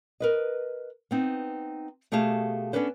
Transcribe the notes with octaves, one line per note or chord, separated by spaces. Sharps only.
A#4 B4 D#5
B3 C4 D#4
B2 A3 G4 G#4 F5 A5
B3 C#4 D4 A4 B4 C5